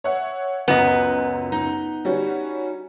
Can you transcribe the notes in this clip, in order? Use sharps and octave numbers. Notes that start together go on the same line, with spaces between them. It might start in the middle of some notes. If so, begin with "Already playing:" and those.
C#5 E5 F#5
C#2 F#2 B3 D#5 G#5
D#4
G3 C#4 F#4